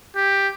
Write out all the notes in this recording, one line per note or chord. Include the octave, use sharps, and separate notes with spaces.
G4